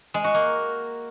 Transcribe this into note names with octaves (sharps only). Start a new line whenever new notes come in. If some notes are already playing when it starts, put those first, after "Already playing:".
G#3
F#4
A#3